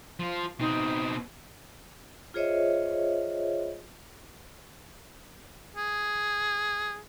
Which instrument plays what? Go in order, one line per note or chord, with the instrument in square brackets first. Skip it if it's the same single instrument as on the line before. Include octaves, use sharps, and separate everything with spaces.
[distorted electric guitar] F3 F4
[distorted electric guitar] B2 C4 [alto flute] D#4
[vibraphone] F4 G#4 C5 C#5 D#5 E5
[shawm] G#4